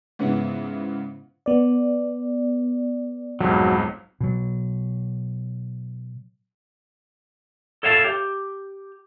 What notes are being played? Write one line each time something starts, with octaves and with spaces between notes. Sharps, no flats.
G#2 C#3 B3 C#4 E4
B3 D5
B1 F2 G#2 F#3
B2 F#3
A4 C#5 E5 F5 G5 A5
G4